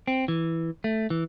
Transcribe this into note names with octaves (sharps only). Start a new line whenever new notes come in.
C4
E3
A3
E3